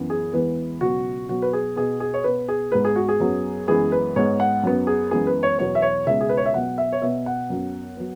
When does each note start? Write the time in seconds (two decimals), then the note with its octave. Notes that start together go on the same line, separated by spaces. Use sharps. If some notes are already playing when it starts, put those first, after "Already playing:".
Already playing: F#2 E3 B3
0.10 G#4
0.33 E2 E3 G#3 B3 B4
0.81 C#2 B2 F#3 B3 F#4
1.29 B2 F#3 B3 F#4
1.42 B4
1.53 G#4
1.76 B2 B3 G#4
2.00 G#4
2.14 C#5
2.24 B2 B3 B4
2.49 G#4
2.72 G#2 G#3 B3 B4
2.85 G#4
2.96 F#4
3.09 G#4
3.20 F#2 F#3 B3
3.68 F#2 E3 G#3 B3 G#4
3.92 B4
4.16 G#2 G#3 B3 C#5
4.40 F#5
4.63 F#2 F#3 B3
4.87 G#4
5.11 F#2 E3 G#3 B3 G#4
5.27 B4
5.43 C#5
5.59 E2 B2 F#3 B3 C#5
5.75 E5
5.82 C#5
6.06 C#2 B2 G#3 E5
6.21 G#4
6.29 B4
6.37 C#5
6.46 E5
6.54 B2 F#3 B3 F#5
6.78 E5
6.92 C#5
7.02 B2 B3 E5
7.26 F#5
7.50 F#2 F#3 B3
7.97 F#3 B3